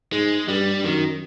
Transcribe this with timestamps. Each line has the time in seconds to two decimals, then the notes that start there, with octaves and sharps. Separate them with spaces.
0.12 G#2 G#3
0.48 G2 G3
0.84 F#2 D#3